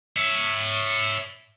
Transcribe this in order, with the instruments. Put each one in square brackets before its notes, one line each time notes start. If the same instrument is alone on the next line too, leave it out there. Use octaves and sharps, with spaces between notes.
[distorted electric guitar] C#5 E5